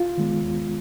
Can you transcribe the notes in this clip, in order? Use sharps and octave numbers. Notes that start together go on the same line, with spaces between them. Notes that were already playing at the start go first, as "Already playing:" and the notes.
Already playing: F4
D#3 G#3 B3
D#2